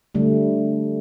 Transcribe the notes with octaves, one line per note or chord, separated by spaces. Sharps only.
D3 G3 A3